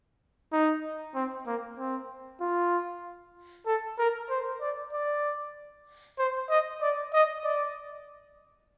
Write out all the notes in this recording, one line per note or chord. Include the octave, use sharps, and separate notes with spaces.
D#4
C4
A#3
C4
F4
A4
A#4
C5
D5
D5
C5
D#5
D5
D#5
D5